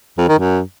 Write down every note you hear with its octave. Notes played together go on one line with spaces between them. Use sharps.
F2
D#3
F#2